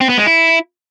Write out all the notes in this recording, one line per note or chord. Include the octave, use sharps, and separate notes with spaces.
C4
B3
G#3
E4